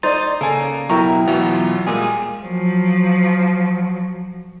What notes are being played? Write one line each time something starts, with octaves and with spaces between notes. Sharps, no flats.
D#4 C5 D5 C6 A6
C#3 A#3 A4 G#5
B2 F#3 E4 G4 A#4 A#5 C#6
B2 E3 F#3 F5
F4
A#2 G3 G#3 A#3 G#4
F3 F#3